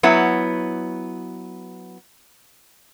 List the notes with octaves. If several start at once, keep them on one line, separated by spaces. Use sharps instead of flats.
F#3 B3 E4 C#5